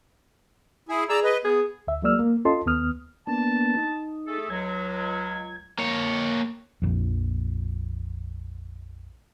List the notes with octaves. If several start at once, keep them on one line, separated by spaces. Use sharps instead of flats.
E4 G#4
G#4 D5 A#5 E6
B4 D#5
B3 G#4
D2 E5
F#3 G#3 A#3 D5 E6 F6
A#3
C#4 F4 A4 D#5 A5 C6
D#2 B3 D#6 F6
A#3 B3 D4 A5
D#4
A3 G#4 A4
C#2 F#3 G#6
A#3 C#5
A#1 F2